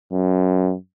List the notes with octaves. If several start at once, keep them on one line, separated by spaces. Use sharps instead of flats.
F#2